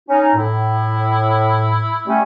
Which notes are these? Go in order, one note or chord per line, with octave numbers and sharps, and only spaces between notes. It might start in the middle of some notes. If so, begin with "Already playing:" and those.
C#4 D#4
A2 E4
G3 A3 C#4